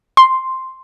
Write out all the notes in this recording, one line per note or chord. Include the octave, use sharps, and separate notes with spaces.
C6